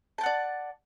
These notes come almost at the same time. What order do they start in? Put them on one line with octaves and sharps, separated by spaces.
A5 G5 F#5 D5